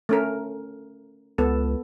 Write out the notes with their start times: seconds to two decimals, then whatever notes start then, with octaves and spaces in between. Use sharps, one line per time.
0.09 A3 C#4 A#4
1.38 C#2 B3 A4